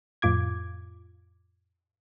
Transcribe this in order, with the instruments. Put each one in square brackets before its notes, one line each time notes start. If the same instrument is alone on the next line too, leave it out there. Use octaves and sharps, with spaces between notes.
[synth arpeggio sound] F2 A2 F4 D6 G#6